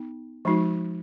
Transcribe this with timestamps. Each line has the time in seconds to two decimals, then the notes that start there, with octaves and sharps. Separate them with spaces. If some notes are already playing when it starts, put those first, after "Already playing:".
Already playing: B3 D#4
0.45 F3 G#3 D#4 F#4